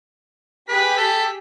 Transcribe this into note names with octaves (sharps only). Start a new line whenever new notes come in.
G4 G#4 B4 B6
A4